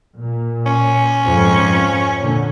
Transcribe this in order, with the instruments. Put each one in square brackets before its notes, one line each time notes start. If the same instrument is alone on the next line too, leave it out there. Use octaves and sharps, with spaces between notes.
[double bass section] A#2
[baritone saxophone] C#4
[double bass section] F2 G#2
A#2 D3